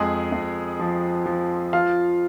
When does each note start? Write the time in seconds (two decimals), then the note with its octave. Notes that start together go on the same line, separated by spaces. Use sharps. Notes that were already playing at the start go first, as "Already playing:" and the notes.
Already playing: F2 G#3 G#4
0.32 F2
0.79 F3
1.26 F3
1.73 F3 F4 F5